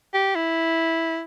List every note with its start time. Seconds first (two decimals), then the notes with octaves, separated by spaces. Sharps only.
0.14 G4
0.35 E4